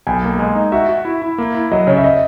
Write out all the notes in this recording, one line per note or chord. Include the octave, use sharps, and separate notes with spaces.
B1 G#5
A#3
G#3
D#4
F#4 E5
F#4
E4
E4
A#3
E4
F#3 D#5
C#3 C#5
E5
D#5